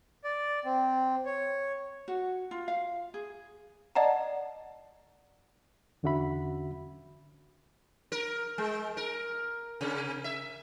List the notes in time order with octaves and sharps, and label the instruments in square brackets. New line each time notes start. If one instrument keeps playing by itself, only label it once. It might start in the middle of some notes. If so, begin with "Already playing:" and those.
[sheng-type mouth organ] D5
C4
C#5
[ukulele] F#4
F4
F5
G#4
[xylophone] D5 D#5 F#5 A5 A#5
[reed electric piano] E2 D3 C#4 F#4 E5 B5
[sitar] A#4
G#3
A#4
C3
E5